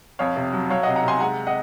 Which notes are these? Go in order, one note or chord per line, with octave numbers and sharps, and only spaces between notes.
F2 C#5 F5
C3
F#3
F#3 C#5 F5
D#5 F#5
C3
F#5 A#5
C3 G#5 C6
G#3 F#5 A#5
D#5 F#5